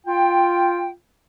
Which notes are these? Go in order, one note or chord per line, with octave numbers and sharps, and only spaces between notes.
F4 G5